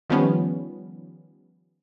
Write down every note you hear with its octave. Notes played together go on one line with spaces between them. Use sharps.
D#3 F3 G3 B3 C#4